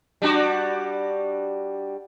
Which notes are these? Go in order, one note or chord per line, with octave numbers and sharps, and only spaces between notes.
G3 D4 F#4